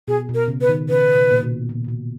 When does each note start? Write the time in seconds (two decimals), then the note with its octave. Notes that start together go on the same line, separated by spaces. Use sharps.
0.08 B2 G#4
0.29 B2
0.34 A#4
0.48 C#3
0.61 B4
0.69 D#3
0.89 C#3 B4
1.15 B2
1.31 A#2
1.43 B2
1.69 A#2
1.84 A#2
1.88 B2